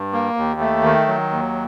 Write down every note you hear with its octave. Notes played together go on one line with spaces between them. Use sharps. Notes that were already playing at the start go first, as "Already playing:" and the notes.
Already playing: G2
A#3
D#2
A3
D#3
F#3
D#2